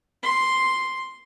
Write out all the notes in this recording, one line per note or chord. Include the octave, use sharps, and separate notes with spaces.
C6